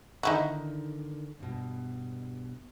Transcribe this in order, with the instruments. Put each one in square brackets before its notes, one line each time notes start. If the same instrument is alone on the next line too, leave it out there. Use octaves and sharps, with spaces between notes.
[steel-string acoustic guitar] D3 D#3 [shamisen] D#4 E4 F#4
[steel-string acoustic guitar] G2 B2